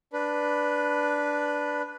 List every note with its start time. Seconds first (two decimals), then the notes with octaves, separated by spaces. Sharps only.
0.13 D4 B4